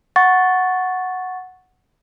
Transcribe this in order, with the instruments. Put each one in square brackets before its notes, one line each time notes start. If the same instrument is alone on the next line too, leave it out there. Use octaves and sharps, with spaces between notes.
[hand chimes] F#5 C#6 A6